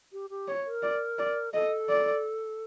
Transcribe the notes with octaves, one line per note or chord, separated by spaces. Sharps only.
G4
G4
C#5
A#4
D5
D5
A4 D#5
D5